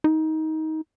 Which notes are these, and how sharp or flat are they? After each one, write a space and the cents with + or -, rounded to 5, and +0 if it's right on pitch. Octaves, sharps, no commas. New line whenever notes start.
D#4 +20